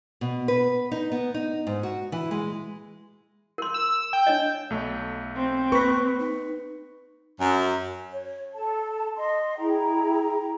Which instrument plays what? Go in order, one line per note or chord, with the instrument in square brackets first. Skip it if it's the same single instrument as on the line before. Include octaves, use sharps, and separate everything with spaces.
[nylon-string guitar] B2
B4
D#4
B3
D#4
G#2
F#4
E3
G#3
[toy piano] A#4 C6
[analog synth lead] E6
G5
[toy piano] D4 C#5 D#5
[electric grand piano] B1 A3
[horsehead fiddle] C4
[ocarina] A#3 [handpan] B4 [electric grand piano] C#6 B6
[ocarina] D#4
[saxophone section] F#2
[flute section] C#5
A4 A5
D#5 C6
E4 G#4 G5 A#5